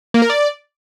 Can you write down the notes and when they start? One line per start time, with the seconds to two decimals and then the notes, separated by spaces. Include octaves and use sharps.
0.14 A#3
0.22 A#4
0.30 D5